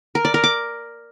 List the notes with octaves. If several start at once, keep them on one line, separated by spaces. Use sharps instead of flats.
A#4
D5
A#4
D6